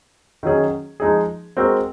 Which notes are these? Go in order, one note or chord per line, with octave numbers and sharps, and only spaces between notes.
D#3 F#3 C#4 G#4
F3 G#3 D#4 G#4
G#3 C4 F#4 A#4